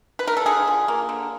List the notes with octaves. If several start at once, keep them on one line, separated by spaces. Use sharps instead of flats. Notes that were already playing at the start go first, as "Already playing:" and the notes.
B4
A#4
A4
D3 G#4
F3
A#3
D3